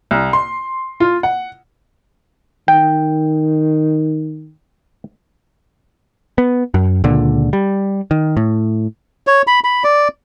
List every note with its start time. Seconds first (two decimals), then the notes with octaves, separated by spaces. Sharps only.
0.11 C2
0.33 C6
1.00 F4
1.23 F#5
2.68 D#3 G5
6.38 B3
6.74 F#2
7.04 C#2 A#2 D3
7.53 G3
8.11 D#3
8.37 A2
9.27 C#5
9.47 B5
9.64 B5
9.84 D5